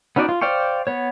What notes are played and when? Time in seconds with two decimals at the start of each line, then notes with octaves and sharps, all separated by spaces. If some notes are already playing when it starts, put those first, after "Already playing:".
0.16 B3 C#4 D#4 F#4 D5
0.29 F4
0.41 C5 D5 F5 G5 C#6
0.87 B3 C#5